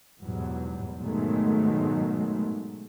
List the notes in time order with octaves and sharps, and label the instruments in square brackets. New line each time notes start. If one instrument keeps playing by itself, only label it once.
[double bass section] E2 G#2 B2 F#3 G3
G#2 B2 D#3 F#3 G#3 A3